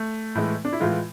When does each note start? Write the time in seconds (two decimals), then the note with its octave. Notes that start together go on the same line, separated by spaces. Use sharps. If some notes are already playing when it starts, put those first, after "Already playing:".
Already playing: A3
0.35 A2 E3 G#3
0.65 D4
0.73 E4
0.80 A2 E3 G#3 F4